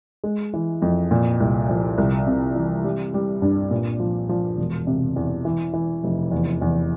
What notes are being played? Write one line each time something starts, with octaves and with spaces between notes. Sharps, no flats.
G#3
E3
F2
A#2
C2
F3
C2
C3
E3
G3
G3
G2
A#2
F3
F3
E1
C3
E2
E3
E3
F1
E2
E2